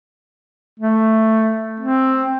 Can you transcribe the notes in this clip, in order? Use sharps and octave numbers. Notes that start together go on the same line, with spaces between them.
A3
C4